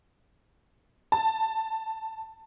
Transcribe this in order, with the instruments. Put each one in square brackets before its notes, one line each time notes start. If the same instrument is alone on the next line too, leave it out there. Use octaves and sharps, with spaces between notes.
[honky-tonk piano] A5